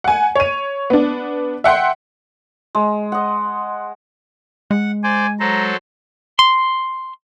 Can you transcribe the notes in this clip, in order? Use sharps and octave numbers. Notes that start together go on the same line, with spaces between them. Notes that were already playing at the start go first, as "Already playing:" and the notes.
F#5 G#5
C#5 D#7
B3 D4
E5 F#5 G5 C6
G#3
D#5 F#5
G#3 F#5
C5 D5 G#5
F#3 A4 C5 A#5
C6